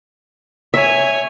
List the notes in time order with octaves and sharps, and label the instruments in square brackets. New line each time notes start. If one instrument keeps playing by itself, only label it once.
[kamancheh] C#5 G#5 [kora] E5